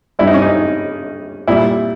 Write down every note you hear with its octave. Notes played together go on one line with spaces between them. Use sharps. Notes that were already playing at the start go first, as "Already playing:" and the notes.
G2 G3 E4
D#4
C#4
D#4
A#2 G3 E4